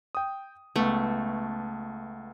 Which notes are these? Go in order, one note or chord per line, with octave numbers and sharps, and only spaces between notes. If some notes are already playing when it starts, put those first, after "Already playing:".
G5 D#6
C#2 A3 B3